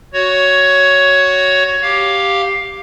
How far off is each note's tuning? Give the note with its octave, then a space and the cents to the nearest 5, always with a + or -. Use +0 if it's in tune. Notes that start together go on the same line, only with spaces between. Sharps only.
F#4 +0 C#5 +10
G4 +0 F5 +10